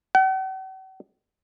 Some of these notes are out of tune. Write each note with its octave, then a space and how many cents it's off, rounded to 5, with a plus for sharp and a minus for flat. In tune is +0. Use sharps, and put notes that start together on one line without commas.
F#5 +45